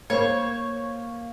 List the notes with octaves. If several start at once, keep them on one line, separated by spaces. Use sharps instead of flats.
A#3 C5 C#5